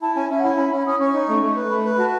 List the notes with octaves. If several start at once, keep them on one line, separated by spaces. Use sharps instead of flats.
E4 A5
C#4 G#5
C#4 E5
F#5
E4 G#5
C#4 B5
C#4
C#4 D#6
C#4 C#6
D#4
A3
A3
B4
A3 B5
B4
F#4 A5